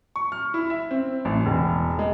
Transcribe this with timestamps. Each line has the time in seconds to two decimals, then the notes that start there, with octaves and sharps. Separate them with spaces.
0.16 C#6
0.32 F6
0.54 E4
0.70 E5
0.91 C4
1.25 A1
1.46 E1
1.99 G#3